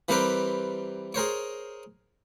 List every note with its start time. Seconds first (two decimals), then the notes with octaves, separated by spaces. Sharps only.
0.09 E3 G3 C4 G4 A#4 B4
1.14 G#4 A#4 C5 C#5